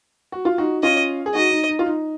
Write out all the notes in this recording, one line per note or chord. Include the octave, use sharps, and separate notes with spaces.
F#4
F4
D#4 F#4
C#4 F4 D#5
G#4
D#4 F#4 D#5
D#4
D#4
F4
D#4